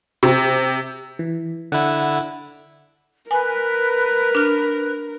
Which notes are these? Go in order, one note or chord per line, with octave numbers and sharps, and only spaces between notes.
C3
E3
D3 E4 F#5
A#4 B4 G#5
D4 F6